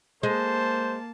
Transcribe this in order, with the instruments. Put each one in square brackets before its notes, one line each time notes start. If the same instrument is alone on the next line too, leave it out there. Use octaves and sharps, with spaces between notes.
[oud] G#3 [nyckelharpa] A#3 A5 [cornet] C5